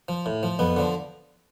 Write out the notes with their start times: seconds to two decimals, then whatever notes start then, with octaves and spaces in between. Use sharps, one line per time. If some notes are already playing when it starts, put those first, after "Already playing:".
0.08 F3
0.26 A2
0.43 F3
0.59 F2 B3
0.77 D3 F3